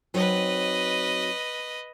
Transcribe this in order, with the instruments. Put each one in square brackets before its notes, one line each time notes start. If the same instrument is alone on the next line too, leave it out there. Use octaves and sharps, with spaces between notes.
[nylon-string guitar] F#3 C4 D#4 [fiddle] B4 D#5